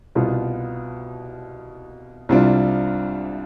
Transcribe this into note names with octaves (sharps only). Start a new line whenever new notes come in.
C2 B2 B3 F4
C2 C3 G3 D4 F4